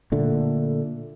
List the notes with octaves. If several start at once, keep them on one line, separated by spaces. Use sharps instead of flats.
A#2 D3 A3